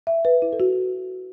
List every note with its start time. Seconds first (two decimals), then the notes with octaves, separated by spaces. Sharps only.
0.07 E5
0.25 B4
0.42 E4
0.53 A4
0.60 F#4